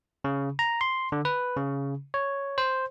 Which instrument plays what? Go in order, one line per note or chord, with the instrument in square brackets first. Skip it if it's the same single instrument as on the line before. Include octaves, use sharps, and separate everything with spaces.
[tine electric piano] C#3
A#5
C6
D3
B4
C#3
C#5
C5